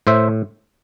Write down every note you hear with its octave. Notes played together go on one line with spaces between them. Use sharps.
A2 C5 E5